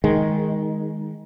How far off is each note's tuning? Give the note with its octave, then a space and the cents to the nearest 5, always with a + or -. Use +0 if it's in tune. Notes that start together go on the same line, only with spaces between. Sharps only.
D#3 +15 G#3 +0